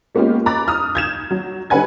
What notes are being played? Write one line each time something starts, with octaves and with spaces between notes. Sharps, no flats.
G#3 A#3 B3 C#4 F4 G4
A#5 B5 D6 F#6 A6
D#6 F6
G6 G#6 E7
F#3
D3 G3 B4 F#5 G#5 G#6